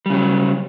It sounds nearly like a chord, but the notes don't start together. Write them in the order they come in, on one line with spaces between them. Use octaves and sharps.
G3 C#3 F#3